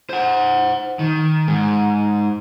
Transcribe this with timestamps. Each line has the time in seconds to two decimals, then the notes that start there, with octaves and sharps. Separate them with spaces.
0.10 C5 F#5
0.99 D#3
1.47 G#2